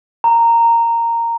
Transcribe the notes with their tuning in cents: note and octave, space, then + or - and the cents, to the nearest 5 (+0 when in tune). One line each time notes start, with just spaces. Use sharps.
A#5 -10